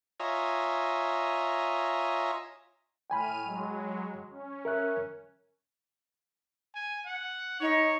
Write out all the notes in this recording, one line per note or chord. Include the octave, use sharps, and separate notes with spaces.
F4 C#5 D#5 E5 G#5 A#5
A2 G5 G#5 B5 F6 D#7
F#3 G#3
C#4
A#4 E5 F#6
G#5
F#5
D#4 C#5